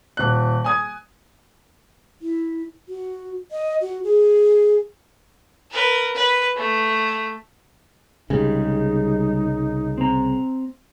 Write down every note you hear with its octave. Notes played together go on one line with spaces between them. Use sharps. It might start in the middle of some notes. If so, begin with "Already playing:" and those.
D#1 F#6
G#5 D#6 G#6
E4
F#4
D#5
F#4
G#4
A#4 B4
B4
A3
C2 C#3 G3 G#3 D#4
C4 A#5